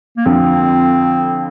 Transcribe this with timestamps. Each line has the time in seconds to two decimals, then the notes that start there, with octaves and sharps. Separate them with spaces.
0.17 A#3
0.25 F2 D3 F3 C4